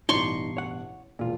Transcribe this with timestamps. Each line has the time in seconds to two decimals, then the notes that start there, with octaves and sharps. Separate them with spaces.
0.09 A1 G2 B2 D#4 D5 C6 C#6
0.57 C#5 F#5
1.19 E1 A#2 F4